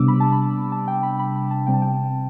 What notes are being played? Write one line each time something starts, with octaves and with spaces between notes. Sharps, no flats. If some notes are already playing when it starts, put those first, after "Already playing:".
Already playing: C3 G3 B3 D4 D6 E6
B5
A5
B5
A5
G5
B5
B5
B5
A5
C3 G3 C4 G5
A5
G5